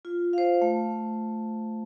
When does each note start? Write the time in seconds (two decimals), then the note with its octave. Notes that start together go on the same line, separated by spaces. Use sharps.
0.05 F4
0.33 C5 F5
0.62 A3